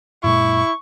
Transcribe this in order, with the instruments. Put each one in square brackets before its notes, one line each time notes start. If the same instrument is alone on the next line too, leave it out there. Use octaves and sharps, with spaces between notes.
[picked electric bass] F#2 A#2 G#3 [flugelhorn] E4 [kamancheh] C#6